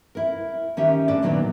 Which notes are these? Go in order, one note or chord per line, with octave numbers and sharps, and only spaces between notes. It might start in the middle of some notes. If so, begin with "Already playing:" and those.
E4 A#4
D#3 C#4 G4 E5
A2 D4 D5
A#2 D#3 F#3 B3 C4 D4